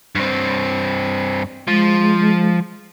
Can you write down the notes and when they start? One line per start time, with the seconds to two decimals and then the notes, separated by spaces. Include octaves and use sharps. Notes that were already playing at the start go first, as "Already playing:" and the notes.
0.15 G2 C4
1.68 F3 G#3